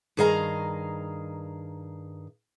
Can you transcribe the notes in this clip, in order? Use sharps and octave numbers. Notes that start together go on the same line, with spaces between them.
G2 D#3 G#4 D#5 F5 A#5